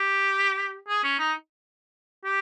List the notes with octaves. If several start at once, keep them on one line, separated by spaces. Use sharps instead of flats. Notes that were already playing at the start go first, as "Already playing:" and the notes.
Already playing: G4
G#4
C#4
D#4
G4